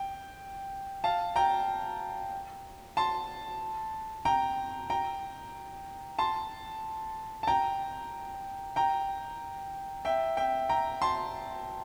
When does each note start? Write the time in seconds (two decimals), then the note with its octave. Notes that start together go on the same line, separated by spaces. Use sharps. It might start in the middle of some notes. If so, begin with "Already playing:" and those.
Already playing: G5
1.04 F5 A5
1.36 G5 A#5
2.97 A5 C6
4.25 G5 A#5
4.90 G5 A#5
6.19 A5 C6
7.43 A5
7.47 G5 A#5
8.76 G5 A#5
10.05 E5 G5
10.37 E5 G5
10.69 G5 A#5
11.02 A5 C6